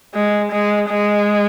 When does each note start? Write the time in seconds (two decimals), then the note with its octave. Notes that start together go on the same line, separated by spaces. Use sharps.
0.14 G#3
0.52 G#3
0.90 G#3